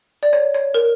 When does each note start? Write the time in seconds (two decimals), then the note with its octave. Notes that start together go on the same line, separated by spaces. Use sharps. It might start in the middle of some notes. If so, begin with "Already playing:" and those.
0.23 D5
0.33 C#5
0.54 C#5
0.74 A#4